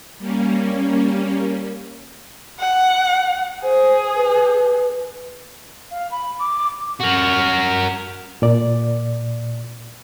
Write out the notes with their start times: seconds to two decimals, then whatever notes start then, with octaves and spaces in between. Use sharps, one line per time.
0.18 G3 A#3 C#4
2.59 F#5
3.64 G#4 C5
4.16 B4
5.91 F5
6.11 B5
6.39 D6
7.00 F#4 A#4
8.42 A#2 D5